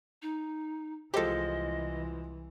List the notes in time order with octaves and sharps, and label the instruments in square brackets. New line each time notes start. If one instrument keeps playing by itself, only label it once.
[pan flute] D#4
[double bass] C2 E3 [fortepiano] F3 G#3 C5 [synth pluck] G4 A4 [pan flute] D#5